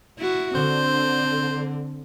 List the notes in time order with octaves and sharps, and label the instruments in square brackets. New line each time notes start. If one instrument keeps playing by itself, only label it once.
[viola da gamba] E4 F#4
[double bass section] D3 [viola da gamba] C4 [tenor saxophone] C5